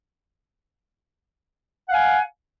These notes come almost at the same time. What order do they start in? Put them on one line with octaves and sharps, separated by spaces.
F#5 F5 G#5